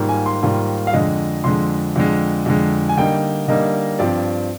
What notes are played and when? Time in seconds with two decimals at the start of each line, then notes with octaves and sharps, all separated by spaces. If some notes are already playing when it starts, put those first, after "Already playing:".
Already playing: G#2 D#3 G3 A#3 F4
0.09 G#5
0.26 C6
0.43 G#2 D#3 G3 A#3 F4
0.87 F5
0.93 F2 D3 G#3 D#5
1.44 F2 D3 G#3 C6
1.96 F2 D3 G#3
2.46 F2 D3 G#3
2.89 G#5
2.97 D3 G3 A#3 D#4 G5
3.48 D3 G3 A#3 D#4 D#5
3.99 G2 F3 C4 D5